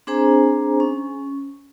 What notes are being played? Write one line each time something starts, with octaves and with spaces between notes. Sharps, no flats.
C4 D4 G#4 C5 G#5 A#5
C#4